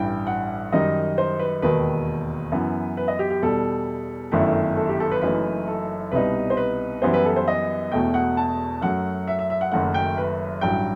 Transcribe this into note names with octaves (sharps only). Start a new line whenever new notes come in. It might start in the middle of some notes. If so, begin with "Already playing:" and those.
Already playing: A1 G2 E3 G5
F#5
F#2 D#3 G3 D#4 D#5
C5
B4
E1 D#2 D#3 B4
F#2 E3 B3
B4
D#5
G4
G4
E2 B2 G3 A4
G1 F#2 D#3 A3 E4
A4
G4
A4
B4
F#1 F#2 E3 A3 D#4 B4
A4
C2 B2 G3 D#4 B4
C5
B4
F#2 E3 G3 B3 E4 C5
B4
A4
C5
D#5
E1 E2 B2 A3 G5
F#5
A5
F#2 F#3 A3 F#5
E5
E5
E5
F#5
F#1 F#2 D#3 A3 F#5
G5
B4
A1 G2 F#3 G5